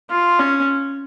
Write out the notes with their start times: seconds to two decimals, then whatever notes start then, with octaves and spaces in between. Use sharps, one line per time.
0.10 F4
0.39 C#4